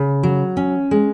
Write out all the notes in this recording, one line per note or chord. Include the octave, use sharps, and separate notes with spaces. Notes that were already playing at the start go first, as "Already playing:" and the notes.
Already playing: C#3
F#3
C#4
G#3